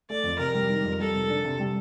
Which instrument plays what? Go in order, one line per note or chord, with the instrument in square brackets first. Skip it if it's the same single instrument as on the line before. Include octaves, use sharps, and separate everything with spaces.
[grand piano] A3 [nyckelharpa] D5
[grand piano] F2
[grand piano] C3 [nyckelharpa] A#4
[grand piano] G3
D#3
F2
[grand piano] G3 [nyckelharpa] A4
[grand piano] C3
D4
C3
G3